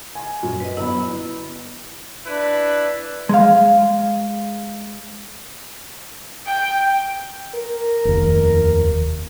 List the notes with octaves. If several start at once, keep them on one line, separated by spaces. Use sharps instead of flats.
G#5
F#2 A#2
B4 D#5
G1 E4 B5
D4 E4 B4
G#3 F5
G5
A#4
F1 D#2